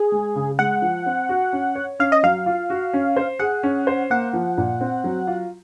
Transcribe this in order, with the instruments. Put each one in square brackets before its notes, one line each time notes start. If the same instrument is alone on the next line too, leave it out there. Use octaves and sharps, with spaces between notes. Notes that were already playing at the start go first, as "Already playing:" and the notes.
Already playing: [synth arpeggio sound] G#4
[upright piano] G#3
C#3
[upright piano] G#3 [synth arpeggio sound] F#5
[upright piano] F3
C4
F#4
C#4
C#5
[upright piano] C#4 [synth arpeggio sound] F5
[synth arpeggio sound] D#5
[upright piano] F#3 [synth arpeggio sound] F5
[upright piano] F4
F#4
C#4
C5
[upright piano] G#4 [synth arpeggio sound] F#5
[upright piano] C#4
C5
[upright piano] A#3 [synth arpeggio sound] F#5
[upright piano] F3
A#2
C4
F#3
F4